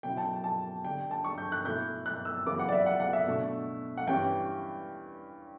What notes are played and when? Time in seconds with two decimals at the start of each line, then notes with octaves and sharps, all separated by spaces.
0.03 B2 F#3 C#4 E4 G5
0.17 A5
0.44 A5
0.84 D3 G3 D4 G5
1.11 A5
1.24 C#6
1.38 G6
1.52 F#6
1.65 B2 A3 E4 G6
2.06 F#6
2.25 E6
2.46 F#2 C#3 E3 B3 D6
2.59 F#5
2.69 D5
2.72 E5
2.86 F#5
3.00 F#5
3.13 E5
3.27 B2 A3 D4
3.97 F#5
4.07 G2 E3 G3 C#4 G5